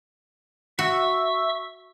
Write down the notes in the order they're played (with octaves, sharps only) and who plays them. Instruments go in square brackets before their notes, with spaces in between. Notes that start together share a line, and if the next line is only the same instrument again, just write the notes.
[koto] F#4 [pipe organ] E5 C#6 E6